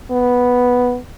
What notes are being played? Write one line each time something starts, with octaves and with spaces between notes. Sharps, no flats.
B3